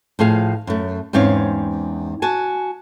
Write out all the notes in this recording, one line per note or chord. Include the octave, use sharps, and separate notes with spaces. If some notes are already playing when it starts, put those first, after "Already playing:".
A2 F3 G#4 F5
F#2 A3
E2 G#2 C4 C#4 F5
F#4 G#5 A5